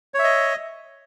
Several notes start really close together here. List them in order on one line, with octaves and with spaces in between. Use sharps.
C#5 E5 D#5